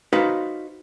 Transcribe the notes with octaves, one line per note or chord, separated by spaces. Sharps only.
D#4 F#4 B4 C5 F5